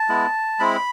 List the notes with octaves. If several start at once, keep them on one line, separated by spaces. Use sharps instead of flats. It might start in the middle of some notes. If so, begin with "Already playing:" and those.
Already playing: A5
G#3 B3 E4
G#3 C4 E4 B5